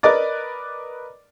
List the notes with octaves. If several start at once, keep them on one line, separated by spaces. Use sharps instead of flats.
A#4 B4 D5 D#5 D6 A6